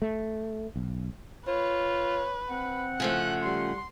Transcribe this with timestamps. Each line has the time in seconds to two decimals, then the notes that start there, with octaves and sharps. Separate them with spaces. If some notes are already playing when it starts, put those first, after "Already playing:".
0.02 A3
0.76 B1
1.47 F4 B4 C#5
2.50 C4 F#5
3.00 C#3 F3 A3 F#6
3.43 G3 C6